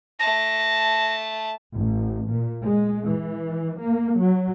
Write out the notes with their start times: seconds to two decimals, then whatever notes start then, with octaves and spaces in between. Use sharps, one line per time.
0.19 A3 A5 A#6
1.73 A1
2.29 A#2
2.63 G#3
3.04 E3
3.79 A#3
4.18 F#3